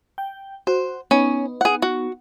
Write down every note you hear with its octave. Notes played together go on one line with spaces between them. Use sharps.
G5
F#4 C5
B3 C#4 D#4
G#4 F#5
F#4